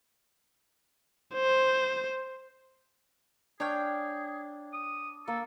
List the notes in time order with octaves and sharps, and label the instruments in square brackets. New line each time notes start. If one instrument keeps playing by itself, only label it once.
[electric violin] C5
[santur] D4 [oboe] G#4 [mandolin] C#5 F5 G5
[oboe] D#6
[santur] A#3 [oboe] A4